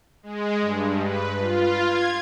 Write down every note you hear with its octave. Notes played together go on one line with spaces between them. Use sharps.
G#3
G2
B4
F4
G#6